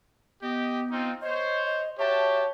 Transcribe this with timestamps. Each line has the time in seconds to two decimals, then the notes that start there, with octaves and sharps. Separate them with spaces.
0.42 B3 G4 D#5
0.90 C4 D#4 F4
1.22 C5 C#5 D#5
1.65 D#5
1.99 F#4 G4 C#5 E5 A5